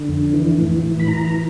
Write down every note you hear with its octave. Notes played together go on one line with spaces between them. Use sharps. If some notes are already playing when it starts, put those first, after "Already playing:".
Already playing: D3
F2
E3
A2
E3
B5
E3 A#5
E3